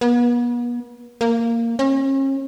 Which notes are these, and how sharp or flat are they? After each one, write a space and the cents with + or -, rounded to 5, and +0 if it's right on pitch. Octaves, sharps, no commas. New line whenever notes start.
B3 -40
A#3 -10
C#4 -40